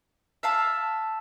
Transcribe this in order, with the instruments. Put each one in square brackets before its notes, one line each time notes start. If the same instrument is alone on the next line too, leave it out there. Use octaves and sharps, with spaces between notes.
[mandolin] E5 F5 A5